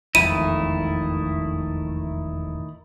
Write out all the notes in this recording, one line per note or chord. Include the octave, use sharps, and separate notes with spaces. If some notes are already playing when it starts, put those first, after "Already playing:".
E1 A1 F2 D#3 A3 E4 D#7